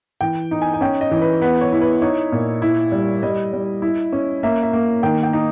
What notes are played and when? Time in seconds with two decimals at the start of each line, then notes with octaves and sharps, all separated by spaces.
0.21 E3 G5
0.51 D#4
0.62 G#5
0.74 G#5
0.81 C#4 G5
1.01 D#5
1.11 E3
1.22 B4
1.42 B3 B4
1.61 C#5
1.72 E4
1.81 B4
2.02 D#4 C#5
2.32 A#2
2.62 E4
2.92 G3
3.23 G3 D#5
3.53 G3
3.82 E4
4.13 C#4
4.43 A#3 E5
4.63 E5
4.73 A#3
5.03 D#3 G5
5.23 G5
5.33 D#4